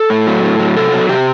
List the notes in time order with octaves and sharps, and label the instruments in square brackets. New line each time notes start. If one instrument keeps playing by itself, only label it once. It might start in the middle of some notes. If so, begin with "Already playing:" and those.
Already playing: [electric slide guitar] A4
A2
F#3
A2
F#3
C3 A4
F#3
C3 G4